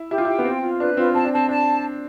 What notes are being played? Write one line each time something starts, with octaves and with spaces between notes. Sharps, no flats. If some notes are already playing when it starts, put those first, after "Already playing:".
Already playing: E4
E4 G4
F4
E4
G5
B3
C4 F4
F4
D4 B4
C4 F4
C4 A5
D4
C4 A5
D4 A5